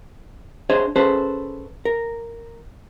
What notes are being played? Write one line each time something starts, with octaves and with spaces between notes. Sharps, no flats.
D4 G#4 C5 C#5 D#5
C#4 G#4 A4 B4 C5
A#4